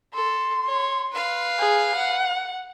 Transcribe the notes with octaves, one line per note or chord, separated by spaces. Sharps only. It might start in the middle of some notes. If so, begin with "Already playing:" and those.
A4 C6
C#5
B4 F5
G#4
F#5